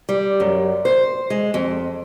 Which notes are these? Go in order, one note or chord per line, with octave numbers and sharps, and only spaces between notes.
G3
F#2
C5
G#3
F2